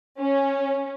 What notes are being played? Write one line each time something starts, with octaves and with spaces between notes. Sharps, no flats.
C#4